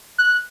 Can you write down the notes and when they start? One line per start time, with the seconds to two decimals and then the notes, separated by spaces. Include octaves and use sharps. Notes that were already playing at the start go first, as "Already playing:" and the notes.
0.18 F#6